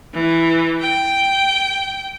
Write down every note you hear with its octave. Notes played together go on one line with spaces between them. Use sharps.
E3
G5